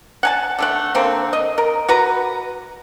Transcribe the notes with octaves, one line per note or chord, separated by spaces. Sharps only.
F#5 G#5 A5
D3 A3 F#5
D3 A#3 C4 C5
D#5
A#4
F#4 B4 A#5